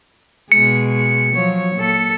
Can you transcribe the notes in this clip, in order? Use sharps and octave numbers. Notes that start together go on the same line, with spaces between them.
B2 G#3 C#7
F3 F#3 C#5
A#2 A4